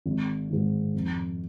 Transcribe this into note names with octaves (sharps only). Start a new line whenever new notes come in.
G#1
G#2 D#3
F2